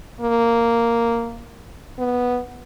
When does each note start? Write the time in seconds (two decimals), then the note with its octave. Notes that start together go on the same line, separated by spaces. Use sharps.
0.21 A#3
1.99 B3